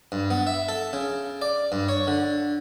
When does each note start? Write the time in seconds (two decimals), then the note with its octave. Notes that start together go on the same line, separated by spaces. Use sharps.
0.12 G2
0.30 B3
0.47 E5
0.69 A4
0.93 C#3
1.42 D5
1.72 G2
1.89 C#5
2.07 D3